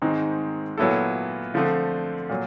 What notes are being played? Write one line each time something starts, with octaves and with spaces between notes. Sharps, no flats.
G#2 D#3 G#3 C4 D#4
A#2 F#3 B3 E4 A4
D3 F3 A3 C4
A#2 F#3